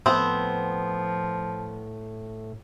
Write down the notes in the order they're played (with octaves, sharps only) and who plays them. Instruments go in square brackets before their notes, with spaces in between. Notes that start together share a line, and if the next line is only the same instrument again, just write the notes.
[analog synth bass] A2 [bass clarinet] F3 [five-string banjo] B3 C4